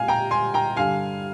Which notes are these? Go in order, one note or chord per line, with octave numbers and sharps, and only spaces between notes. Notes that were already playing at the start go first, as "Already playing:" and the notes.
Already playing: A#2 G#3 C4 F5 G#5
G5 A#5
G#5 C6
G5 A#5
G2 D3 G3 F5 G#5